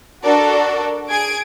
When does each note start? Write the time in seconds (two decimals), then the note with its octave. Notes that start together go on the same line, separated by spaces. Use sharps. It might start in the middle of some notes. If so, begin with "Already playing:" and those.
0.23 D4 F#4 A4 A#4 D5
1.10 G#4 G#6 D7